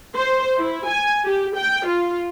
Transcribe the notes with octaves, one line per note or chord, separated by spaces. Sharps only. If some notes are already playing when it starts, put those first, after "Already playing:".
C5
E4
G#5
G4
G5
F4